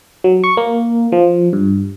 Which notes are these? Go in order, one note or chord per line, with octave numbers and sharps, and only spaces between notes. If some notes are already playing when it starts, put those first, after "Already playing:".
F#3
C#6
A#3
F3
G2